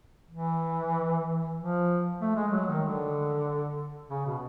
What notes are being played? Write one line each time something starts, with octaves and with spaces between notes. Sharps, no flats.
E3
F3
A3
G#3
F#3
D#3
D3
C#3
B2